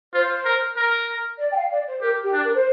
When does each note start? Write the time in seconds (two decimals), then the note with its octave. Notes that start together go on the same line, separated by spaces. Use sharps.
0.14 F4 C5
0.45 A#4
0.77 A#4
1.40 D5
1.51 G5
1.55 F5
1.71 D5
1.87 C5
2.02 G4 A#4
2.23 G4
2.33 D4
2.44 A#4
2.54 C5